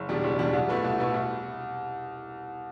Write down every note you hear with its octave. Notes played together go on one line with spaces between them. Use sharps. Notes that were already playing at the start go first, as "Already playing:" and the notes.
Already playing: F#1
E2 B2 G3 D4
F#1
E2 B2 G3 D4
C2
B2 A3 E4 B4
C2
B2 A3 E4 B4
C2